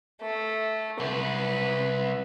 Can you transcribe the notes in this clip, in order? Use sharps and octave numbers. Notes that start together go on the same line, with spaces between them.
A3
C2 B4